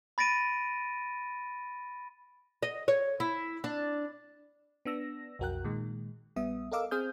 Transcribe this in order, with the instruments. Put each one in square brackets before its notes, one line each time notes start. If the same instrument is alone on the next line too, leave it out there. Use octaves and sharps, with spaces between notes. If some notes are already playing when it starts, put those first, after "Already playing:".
[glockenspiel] B5 A6 A#6 D7 D#7
[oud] D#5
C#5
E4
D4
[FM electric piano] B3 D4 E6 A#6
B1 F2 F#4 A#4 G5 F#6
A#2 D#3 G#3
A#1 G3 B3 E5 D#6
A4 A#4 D#5 F5 D6 E6
C4 G#4 C5 D#6 F6 G6